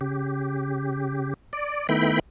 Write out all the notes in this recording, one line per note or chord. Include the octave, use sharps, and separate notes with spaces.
C#3 G4
D5
D#3 A3 B3 E4 G5 B5